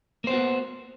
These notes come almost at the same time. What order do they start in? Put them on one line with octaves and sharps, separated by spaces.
A#3 C5 B3 F#4